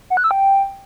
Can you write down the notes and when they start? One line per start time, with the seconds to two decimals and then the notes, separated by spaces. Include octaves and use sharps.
0.10 F#5
0.17 F#6
0.24 E6
0.31 G5